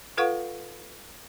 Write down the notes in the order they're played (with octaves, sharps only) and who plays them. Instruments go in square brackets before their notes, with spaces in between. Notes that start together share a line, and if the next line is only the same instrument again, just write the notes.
[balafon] F4 A4 B4 F5 F#5 C#6